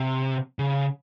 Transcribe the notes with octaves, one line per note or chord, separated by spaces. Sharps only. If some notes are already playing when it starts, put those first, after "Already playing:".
Already playing: C3
C#3